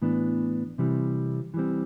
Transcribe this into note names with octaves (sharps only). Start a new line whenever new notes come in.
A2 E3 B3 D4
C3 E3 G3 C4
E3 G3 C4